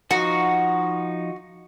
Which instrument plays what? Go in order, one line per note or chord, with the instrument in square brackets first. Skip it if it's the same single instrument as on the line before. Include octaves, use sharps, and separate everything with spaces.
[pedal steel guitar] F3 D#4 [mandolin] F#4